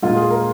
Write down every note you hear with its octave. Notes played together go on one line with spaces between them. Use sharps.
A#2 G#3 F4
G#4
A#4